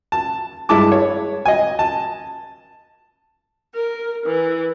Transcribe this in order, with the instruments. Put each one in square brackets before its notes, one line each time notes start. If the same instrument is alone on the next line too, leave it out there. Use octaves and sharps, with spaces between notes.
[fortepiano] A5
G2 G#3 E4 A5 D6
C#5
D#5 G#5
A5
[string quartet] A#4
E3